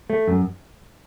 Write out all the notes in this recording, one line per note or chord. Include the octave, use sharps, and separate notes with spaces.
A3
F#2